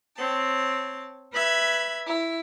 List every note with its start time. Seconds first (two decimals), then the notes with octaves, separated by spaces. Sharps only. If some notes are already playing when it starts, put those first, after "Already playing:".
0.16 C4 C#5 A5
1.32 B4 E5 F#6 G#6
2.05 E4